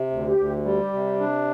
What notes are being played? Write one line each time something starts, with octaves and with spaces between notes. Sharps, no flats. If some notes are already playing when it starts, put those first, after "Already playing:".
Already playing: C3
D2
G4
D2
G3 G4
C3
D4